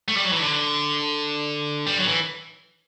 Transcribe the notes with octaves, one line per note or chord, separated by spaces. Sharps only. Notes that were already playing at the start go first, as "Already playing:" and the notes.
A3
G3
F#3
E3
D3
G3
F#3
E3